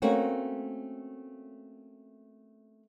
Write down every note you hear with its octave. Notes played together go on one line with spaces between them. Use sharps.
A3 A#3 C4 C#4 F#4